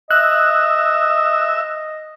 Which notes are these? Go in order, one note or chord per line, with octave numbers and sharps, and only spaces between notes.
D#5 E5 F#6